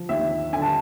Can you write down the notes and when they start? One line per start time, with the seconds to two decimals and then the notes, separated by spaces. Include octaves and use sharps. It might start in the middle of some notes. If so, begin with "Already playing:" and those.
Already playing: F3
0.09 D#2 E5
0.53 D3 G#5
0.62 A5